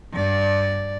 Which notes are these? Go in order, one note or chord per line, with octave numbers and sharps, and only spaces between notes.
G2 D5